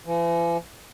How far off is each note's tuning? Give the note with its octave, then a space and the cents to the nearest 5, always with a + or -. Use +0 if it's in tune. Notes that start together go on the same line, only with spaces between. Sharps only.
E3 +45